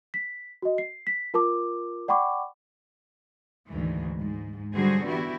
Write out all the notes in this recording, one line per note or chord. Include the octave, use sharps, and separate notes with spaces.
B6
F#4 D#5
C7
B6
F4 A#4 A5 D6
D5 F#5 G5 B5 C#6 D6
D2 G#2 D#3 E3
G#2
D3 F#3 G3 F#4 G#4 C5
E3 B3 E4 F#4 G4